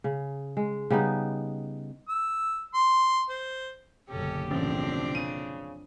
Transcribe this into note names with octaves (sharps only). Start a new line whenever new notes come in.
C#3
G#3
C#3 G3 B3 D#4
E6
C6
C5
F#1 B1 D3 C#4 G4 A4
A1 F3 C4 D4
C#3 D#7